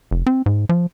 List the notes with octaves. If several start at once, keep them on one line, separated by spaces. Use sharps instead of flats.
F1
C4
G#2
F3